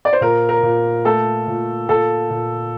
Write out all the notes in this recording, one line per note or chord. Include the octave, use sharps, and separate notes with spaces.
D5
C5
A#2 A#4
A#4
A#2
A3 A4
A#2
A#2 A4
A#2